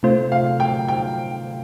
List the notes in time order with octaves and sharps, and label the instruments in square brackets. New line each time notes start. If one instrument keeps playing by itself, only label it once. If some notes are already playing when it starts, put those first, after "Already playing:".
[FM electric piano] C3 A3 F4 [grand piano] C5
[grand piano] F5
G5
G5